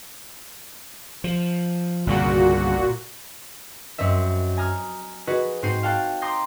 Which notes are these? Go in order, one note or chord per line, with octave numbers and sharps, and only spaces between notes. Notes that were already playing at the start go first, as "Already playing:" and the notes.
F3
G1 C2 A#2 C#3 F#4
F#2 C4 D#5 E5
G#5 A#5 D#6 F6
F#4 G#4 B4 D#5
G#2 C4 F#4 G6 C7 D#7
F#4 F5 G5 A5 F#6
A#5 C6 D6 D#6 G6 A#6